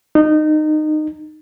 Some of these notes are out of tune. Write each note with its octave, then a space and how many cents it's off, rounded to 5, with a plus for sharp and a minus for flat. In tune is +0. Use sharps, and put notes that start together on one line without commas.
D#4 -20